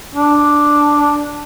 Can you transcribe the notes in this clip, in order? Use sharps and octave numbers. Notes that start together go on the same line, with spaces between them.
D4